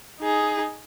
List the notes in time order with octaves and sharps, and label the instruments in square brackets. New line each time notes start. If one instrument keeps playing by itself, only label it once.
[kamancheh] D#4 G#4